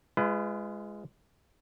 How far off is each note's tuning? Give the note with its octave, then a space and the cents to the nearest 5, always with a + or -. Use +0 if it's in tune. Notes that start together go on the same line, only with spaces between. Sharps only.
G#3 +0 F4 -35 B4 +20